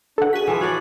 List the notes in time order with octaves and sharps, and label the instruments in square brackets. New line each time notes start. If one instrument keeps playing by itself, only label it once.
[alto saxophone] D4 [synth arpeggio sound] A4 F#5
[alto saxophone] F#4 [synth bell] G#4 B6
[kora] E3 F3
[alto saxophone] F#4 [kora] C#5 D5